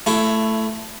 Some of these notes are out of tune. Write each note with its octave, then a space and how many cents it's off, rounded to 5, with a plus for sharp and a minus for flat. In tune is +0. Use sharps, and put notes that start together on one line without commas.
A3 +0 E4 +20